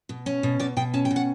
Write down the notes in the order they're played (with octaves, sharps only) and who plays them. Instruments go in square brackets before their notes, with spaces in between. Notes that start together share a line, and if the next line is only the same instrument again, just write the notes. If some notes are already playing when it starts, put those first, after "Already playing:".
[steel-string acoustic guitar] B2
C#4
B2
B2 D5
B2 G5
C#4 A5
G5
B2
F#5